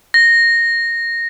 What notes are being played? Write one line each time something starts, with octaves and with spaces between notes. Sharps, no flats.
A#6